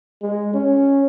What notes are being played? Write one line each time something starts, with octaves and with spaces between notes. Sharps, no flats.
G#3
C#4